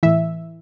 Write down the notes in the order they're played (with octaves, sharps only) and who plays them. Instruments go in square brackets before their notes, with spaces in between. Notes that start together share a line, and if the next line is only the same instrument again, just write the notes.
[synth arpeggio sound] A2 E3 E5